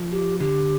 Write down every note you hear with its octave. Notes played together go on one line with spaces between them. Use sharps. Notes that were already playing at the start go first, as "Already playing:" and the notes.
Already playing: F3
G4
D3 G4